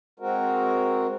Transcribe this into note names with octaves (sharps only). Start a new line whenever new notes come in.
G#3 C4 F#4 A#4